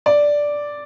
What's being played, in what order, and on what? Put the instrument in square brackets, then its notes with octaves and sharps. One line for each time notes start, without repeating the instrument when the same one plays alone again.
[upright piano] D5